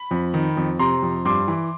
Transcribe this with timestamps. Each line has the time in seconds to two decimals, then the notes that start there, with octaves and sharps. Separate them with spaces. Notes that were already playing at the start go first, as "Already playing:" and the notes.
Already playing: B5
0.11 F2
0.34 D#3
0.57 F2
0.79 C3 A#5 C6
1.02 F2
1.25 G2 C6 D6
1.48 E3